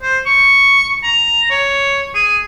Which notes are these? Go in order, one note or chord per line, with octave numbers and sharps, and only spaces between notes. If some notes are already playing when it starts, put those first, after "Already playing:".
C5
C#6
A#5
C#5
G#4